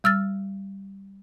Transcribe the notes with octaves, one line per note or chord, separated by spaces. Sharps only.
G3 E6 F6 A6